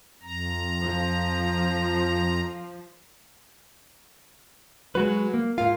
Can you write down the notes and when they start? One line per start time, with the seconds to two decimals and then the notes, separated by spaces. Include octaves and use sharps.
0.23 F2 A#5
0.81 F3
4.95 F#3 G#3 F#4 B4
5.34 A#3
5.58 G#2 F4 A#4 F5